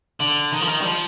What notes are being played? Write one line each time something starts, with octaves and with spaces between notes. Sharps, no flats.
D3
D#3
F3
D#3
G3
F3